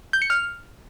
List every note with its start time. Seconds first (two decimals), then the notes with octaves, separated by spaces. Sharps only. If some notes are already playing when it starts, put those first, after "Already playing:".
0.13 G6
0.22 C#7
0.30 F6